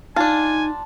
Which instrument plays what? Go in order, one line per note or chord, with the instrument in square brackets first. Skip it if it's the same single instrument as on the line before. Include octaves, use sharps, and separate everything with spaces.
[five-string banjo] D4 F4 [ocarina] D#4 [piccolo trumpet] G#5 [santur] A5